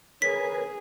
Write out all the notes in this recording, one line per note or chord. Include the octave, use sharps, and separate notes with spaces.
G#4 A#4 B4 C#5 G#5 B6